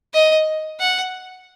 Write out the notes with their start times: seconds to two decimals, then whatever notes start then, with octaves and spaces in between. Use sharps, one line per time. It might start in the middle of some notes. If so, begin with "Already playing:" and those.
0.14 D#5
0.79 F#5